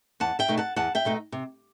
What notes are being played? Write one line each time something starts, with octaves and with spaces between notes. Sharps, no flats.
E2 F#5 A5
E5 G5
B2 A3 D#4
F#5 A5
E2 F#5 A5
E5 G5
B2 A3 D#4
C3